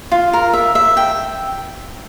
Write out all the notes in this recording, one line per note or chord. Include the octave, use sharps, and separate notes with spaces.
F4
A#4
E5
E5
G5